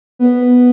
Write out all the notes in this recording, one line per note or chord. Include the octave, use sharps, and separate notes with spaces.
B3